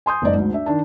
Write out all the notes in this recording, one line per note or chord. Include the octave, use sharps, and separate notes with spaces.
G#5 C6 D#6 G6
F#1 G#2 D5 D#5
D2 G#2
D4 E5
D#3 D4 A5